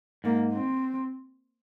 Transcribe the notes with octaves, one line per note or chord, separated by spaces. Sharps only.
G#2 A#3
C4